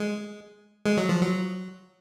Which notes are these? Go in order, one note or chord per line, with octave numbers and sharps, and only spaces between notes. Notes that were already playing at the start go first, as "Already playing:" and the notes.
Already playing: G#3
G#3
F#3
F3
F#3